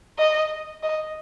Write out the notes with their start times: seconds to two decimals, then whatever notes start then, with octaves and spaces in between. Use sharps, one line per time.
0.19 D#5
0.83 D#5